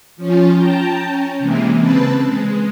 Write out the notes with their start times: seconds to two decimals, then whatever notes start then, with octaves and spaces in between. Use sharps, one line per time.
0.17 F3 C#4 F4
0.55 G5 A5 A#5 G6
1.05 C#4
1.39 C3 E3 G#3 A#3
1.78 C#3 C4 B4 A5
2.22 G#3